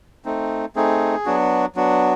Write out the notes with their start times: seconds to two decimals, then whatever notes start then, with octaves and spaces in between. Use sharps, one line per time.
0.25 A3 C4 D#4
0.76 A3 C4 D#4 G#4
1.26 F#3 B3 D4 F#4
1.76 F#3 B3 D4 F#4